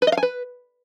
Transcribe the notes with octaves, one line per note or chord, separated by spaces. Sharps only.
B4
D#5
F5
G#5
B4